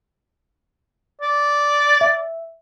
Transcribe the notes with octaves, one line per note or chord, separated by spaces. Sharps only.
D5
E5